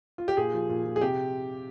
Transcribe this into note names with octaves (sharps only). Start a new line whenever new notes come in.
F4
G4
A#2 G#4
F3
A#2
F3
G#4
C3 G4